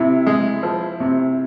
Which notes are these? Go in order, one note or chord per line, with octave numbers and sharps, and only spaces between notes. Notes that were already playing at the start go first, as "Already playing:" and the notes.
Already playing: C3 E4
G#3
F3
C3